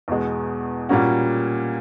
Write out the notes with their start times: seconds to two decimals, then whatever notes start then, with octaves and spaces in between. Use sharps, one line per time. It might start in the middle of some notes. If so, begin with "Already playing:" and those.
0.08 E2 B2 G#3
0.89 A#2 G3 A#3 C#4 F#4